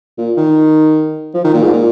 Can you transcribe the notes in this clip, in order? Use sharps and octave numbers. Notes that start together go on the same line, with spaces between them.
A#2
D#3
F3
D#3
A#2
G#2
A#2